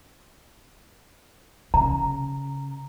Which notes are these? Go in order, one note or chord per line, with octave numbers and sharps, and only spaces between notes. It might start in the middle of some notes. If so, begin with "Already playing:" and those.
C#3 A#5